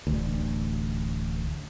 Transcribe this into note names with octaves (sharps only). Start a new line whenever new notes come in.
D1 A1 D2